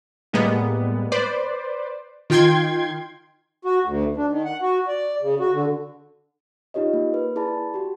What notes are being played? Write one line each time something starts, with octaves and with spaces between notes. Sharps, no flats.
A2 G3 G#3 A#3 B3
B4 C5 D5
D#3 F4 G5 C6 G#6
F#4
D2
D4
D#3
F#5
F#4
D5
C#3
F#4
D3
D#4 F4 G4 C#5 D#5
A#3
B4
E4 G#4 D5 A5 B5
F#4 G4